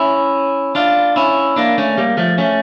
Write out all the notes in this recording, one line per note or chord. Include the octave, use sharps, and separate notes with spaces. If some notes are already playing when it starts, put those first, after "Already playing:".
Already playing: C#4 E4
D4 F4
C#4 E4
A#3 D4
A3 C#4
G3 A#3
F3 A3
A3 C#4